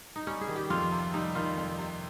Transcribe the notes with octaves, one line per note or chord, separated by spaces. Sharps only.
D#4
G3 C#4
G#4
D#3
G4
F2 F4
C3
G3 D#4
D#3 F4
F2
C3